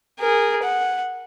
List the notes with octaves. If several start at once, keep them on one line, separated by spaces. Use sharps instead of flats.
G#4 A#4
F#5